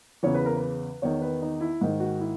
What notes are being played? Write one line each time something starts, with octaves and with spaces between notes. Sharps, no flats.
E2 C#3 E3 C#5
B4
A#4
B4
E2 D#3 C#5
B4
D#4
E4
G#2 D#3
F#4
E4